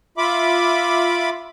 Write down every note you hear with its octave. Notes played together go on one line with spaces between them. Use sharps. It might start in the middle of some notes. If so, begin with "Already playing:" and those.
F4 E5 B5 D6